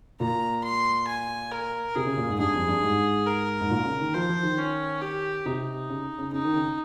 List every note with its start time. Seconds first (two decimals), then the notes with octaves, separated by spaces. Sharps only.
0.20 A#2 A#5
0.64 C6
1.08 G#5
1.52 A#4
1.95 C3 G#4
2.06 C#3
2.17 A#2
2.28 G#2
2.39 G2 G#4
2.54 F2
2.68 G2
2.83 G#2
3.26 A#4
3.61 G#2
3.70 A#2
3.85 C#3
4.00 D#3
4.14 F3 C5
4.29 F3
4.43 D#3
4.58 C#4
5.02 G4
5.46 C3 D#4
5.90 C#3
6.18 C#3
6.33 C#3 D#4
6.44 D#3
6.55 C#3